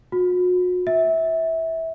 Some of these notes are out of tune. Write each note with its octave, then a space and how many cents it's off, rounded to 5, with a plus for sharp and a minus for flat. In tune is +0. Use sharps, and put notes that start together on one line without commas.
F#4 -40
E5 -20